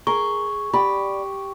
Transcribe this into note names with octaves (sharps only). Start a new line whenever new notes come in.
G#4 A#4 C#6
G4 D5 B5